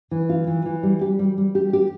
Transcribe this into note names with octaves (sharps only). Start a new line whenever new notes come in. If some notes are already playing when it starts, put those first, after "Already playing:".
E3
F4
E3
E3
G3
G4
G3
G3
G4
G4